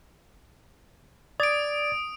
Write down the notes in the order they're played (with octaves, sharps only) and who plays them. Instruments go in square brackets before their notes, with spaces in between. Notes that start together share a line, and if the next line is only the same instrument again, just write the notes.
[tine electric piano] D5 G#6 A6 [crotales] D#6 D7